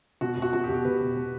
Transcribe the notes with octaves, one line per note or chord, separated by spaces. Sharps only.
B2 F#4
B2 F#4
B2 F#4
G4
B2
G4
B2 B4
B2
B2